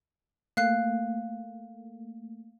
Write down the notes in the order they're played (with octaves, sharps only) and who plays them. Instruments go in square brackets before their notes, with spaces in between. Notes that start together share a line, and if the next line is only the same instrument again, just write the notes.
[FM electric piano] A3 A#3 [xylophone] F5 F#6 C7